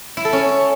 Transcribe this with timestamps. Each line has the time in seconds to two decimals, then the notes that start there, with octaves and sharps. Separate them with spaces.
0.17 E4
0.25 A4
0.33 C#4